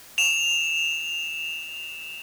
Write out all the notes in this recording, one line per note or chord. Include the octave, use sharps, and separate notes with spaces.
E7 F7